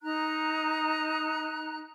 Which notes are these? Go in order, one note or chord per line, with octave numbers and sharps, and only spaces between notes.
D#4 A#5 F#6